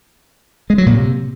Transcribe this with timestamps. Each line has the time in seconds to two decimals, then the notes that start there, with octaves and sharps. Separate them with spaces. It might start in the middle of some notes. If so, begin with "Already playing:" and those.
0.70 G#3
0.78 F#3
0.86 A#2
0.95 C3